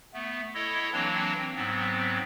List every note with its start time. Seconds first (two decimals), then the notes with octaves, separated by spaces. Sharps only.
0.14 A3 B3
0.54 E4 A4 C#5 D#5
0.93 E3 F#3 A#3 C4 D4 C#5
1.56 G#2 F#3 B3 C4